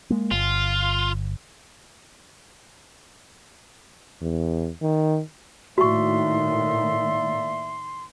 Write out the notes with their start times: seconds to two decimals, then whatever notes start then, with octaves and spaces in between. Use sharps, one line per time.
0.10 G#3 A#3
0.32 G1 F4
4.21 E2
4.82 D#3
5.78 A2 D#3 A#3 F#4 D5 E5 C6 C#6